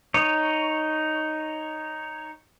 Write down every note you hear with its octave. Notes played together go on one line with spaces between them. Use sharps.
D#4 C#5